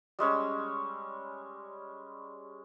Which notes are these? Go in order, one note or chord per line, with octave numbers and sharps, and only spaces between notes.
G3 G#3 C#4 E6